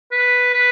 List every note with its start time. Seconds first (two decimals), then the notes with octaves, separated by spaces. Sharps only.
0.12 B4
0.54 B4